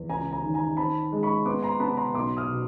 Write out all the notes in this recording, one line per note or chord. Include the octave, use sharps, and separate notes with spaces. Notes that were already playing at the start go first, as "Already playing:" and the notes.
Already playing: E2
C#2 G#5 A#5
G#5 A#5
D#3
G#5 A#5
C4 A5 B5
G#3
B5 C#6
B3 C6 D6
A#5 C6
B3 A5 B5
A#5 C6
B1 C6 D6
D#6 F6
B2